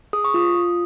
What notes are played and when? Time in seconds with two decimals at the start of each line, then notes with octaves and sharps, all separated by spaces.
0.13 G#4 D#6
0.24 C#6
0.34 F4 D#6
0.54 F4